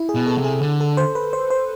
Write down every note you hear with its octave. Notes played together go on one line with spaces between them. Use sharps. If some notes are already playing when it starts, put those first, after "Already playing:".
Already playing: E4
G#4
B2
A4
C3
G#4
D3
A4
C5
B4
C5
C5